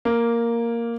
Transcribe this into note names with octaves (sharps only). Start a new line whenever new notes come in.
A#3